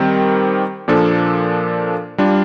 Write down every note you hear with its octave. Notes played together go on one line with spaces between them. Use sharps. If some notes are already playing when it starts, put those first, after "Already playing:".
Already playing: D#3 G3 C4 G4
A#2 F3 A#3 D4 A4
G3 D4 F4